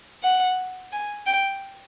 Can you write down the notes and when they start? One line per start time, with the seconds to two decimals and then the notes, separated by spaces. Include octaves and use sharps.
0.23 F#5
0.92 G#5
1.26 G5